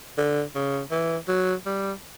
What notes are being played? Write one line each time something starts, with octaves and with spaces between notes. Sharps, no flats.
D3
C#3
E3
F#3
G3